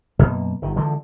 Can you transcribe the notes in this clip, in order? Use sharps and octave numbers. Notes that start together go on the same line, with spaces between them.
F#2 B2 A#3
G1 D#3
D3 E3 F3 G#3